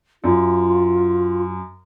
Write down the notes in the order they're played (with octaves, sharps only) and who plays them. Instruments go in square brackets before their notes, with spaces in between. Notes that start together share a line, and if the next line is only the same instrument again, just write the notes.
[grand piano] F#2 [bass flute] F4